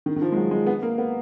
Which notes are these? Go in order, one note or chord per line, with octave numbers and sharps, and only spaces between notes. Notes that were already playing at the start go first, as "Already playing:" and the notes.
D#3
D#3
F3
G#3
F#3
G#3
B3
A#3
B3